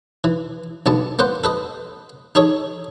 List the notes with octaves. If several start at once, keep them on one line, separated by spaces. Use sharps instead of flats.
E3
B1 D3 B3 A5
A#3 B3 C5 F#5
A4 B4 D#5
D#4 G#4 A4 C#5